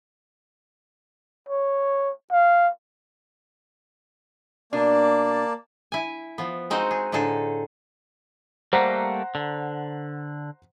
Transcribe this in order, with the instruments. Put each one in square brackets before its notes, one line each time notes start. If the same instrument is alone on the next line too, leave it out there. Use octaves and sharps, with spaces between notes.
[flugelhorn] C#5
F5
[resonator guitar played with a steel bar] B2 D4 [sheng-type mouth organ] A#3 D5 A5
[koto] E4 G#5
F3 B3
G#3 C4 D#4 F#4 D#5
G#4
A2 D3 D#4 G#4 A4
[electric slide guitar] G3 A3 A#3 [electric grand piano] C5 F#5 A#5
[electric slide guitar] D3